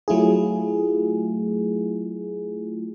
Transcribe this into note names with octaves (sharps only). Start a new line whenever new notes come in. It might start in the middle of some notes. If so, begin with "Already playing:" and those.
F#3 A3 E4 F4 G#4